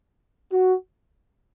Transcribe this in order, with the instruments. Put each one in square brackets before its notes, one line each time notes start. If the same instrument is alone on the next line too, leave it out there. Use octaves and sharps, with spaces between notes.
[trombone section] F#4